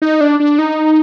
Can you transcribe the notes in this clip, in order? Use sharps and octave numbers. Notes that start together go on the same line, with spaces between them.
D#4
D4
D4
D#4